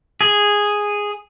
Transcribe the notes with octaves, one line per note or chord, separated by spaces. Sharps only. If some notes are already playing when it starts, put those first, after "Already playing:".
G#4